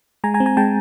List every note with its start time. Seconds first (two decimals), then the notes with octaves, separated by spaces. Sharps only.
0.24 G#3 G#5 A#5
0.34 G#5 A#5
0.40 C4
0.46 G#5 A#5
0.57 G#3 G5 A5